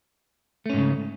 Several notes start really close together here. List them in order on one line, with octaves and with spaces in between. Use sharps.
A3 C#4 G#2 C#3